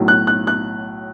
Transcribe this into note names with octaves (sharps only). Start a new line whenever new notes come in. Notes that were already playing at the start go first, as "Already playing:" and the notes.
Already playing: B1 A2 F#3
F#6
F#6
F#6